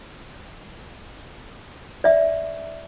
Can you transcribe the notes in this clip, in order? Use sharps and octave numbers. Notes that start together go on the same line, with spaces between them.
D5 E5